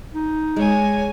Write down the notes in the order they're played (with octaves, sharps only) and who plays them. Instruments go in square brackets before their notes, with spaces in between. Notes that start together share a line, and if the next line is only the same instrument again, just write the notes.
[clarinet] D#4
[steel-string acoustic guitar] G#3 [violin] C#5 G#5